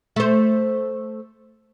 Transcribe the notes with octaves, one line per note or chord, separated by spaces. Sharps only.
A3 C5